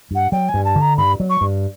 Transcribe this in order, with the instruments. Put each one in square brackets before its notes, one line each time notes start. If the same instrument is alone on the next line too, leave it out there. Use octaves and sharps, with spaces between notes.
[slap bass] G2 [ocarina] F#5
[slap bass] F#3 [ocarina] G5
[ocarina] G#5
[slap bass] G2
[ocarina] A5
[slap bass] D3
[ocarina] A#5
[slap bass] G2 [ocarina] B5
[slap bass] F#3
[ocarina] C#6
[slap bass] G2